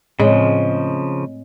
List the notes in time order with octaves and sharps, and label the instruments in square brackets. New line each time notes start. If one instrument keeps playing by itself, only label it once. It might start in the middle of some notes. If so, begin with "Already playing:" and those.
[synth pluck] A2 [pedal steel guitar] C#3 F3 [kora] G#3 [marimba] C4 C#5 D#5